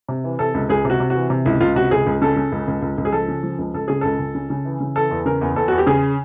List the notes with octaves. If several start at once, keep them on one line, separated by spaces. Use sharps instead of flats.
C3
E3
C3 A4
C#2
C#2 G#4
C3
F#4
C3
F#4
E3
C3
C#2 E4
C#2 F4
C3 F#4
C#2 G#4
C#2
C#3 A4
C#3
C#2
C#2
C#2
C#2
G#4
F3 A4
C#3
F3
C#2
C#2 A4
C#3 G#4
C#2 A4
C#2
C#3
C#3
E3
C#3
E3 A4
E2
C#3 A#4
E2
E2 A4
E2 F#4
G4
C#3 G#4